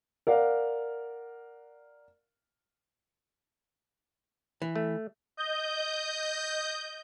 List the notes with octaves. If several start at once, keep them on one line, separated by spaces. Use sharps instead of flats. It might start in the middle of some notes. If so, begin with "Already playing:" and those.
A#4 D5 F5 F#5
E3
A3
D#5 G6